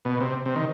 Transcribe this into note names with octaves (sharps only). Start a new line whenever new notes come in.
B2
C3
C3
D#3